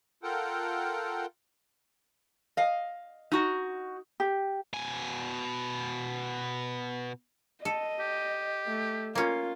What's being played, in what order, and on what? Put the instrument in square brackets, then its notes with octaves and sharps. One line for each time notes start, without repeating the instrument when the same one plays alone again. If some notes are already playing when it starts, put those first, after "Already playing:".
[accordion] F4 A4 A#4 F#5 G5
[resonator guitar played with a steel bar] D#5 F5
D#4 F#4
[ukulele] G4
[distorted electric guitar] B2 G#5
[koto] A4 [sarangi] D#5
[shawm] G4
[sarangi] A3
[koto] A#3 C#4 [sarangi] F4